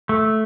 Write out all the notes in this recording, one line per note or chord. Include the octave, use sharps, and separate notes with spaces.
A3